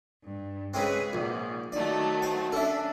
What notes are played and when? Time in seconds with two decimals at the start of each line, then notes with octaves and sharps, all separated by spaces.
0.23 G2
0.74 C#3 G#3 C4 G#4 B4 C#5
1.13 A#1 G#2 C3
1.72 D#3 F#3 A3 D5
2.22 C5
2.52 C#4 D4 A4 E5